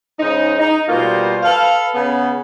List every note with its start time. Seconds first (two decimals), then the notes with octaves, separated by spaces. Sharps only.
0.20 G#2 C#3 D#4
0.60 D#4
0.89 B2 G3 A#3 F4 C5
1.43 A4 B4 F5
1.95 C#3 B3